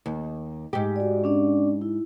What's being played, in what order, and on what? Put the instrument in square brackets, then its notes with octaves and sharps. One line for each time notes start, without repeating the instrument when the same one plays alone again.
[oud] D#2
G#2 G4
[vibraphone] F#4 D5
C#4 D4 D5
E4